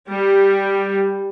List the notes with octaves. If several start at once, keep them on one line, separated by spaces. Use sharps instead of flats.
G3